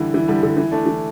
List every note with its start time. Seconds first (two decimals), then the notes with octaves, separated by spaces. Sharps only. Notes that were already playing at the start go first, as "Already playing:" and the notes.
Already playing: D3 E3 G3
0.14 E3
0.28 D3 G3
0.43 D3
0.57 E3
0.71 A3 D4
0.86 E3